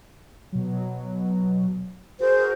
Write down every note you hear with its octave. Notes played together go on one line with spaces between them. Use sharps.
B2 F#3
F#4 G#4 A#4 C5